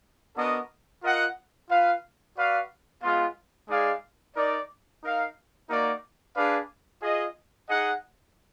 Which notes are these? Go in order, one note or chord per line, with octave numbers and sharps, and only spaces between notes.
B3 D4 F#4 A#4 D#5
F4 A#4 D#5 F#5
F4 B4 F5
F#4 B4 D5 F5
G#3 B3 F4
G#3 D#4 G#4 D5 F5
D#4 A#4 D5
D#4 A#4 F5
A#3 D#4 F#4 A#4 D5
D4 G#4 B4 D5 F5
F4 G#4 D#5
D#4 G#4 D#5 F#5